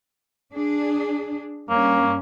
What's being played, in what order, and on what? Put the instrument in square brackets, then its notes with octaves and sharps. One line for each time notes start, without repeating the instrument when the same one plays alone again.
[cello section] D4 G#4
[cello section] G2 C#4 [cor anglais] A#3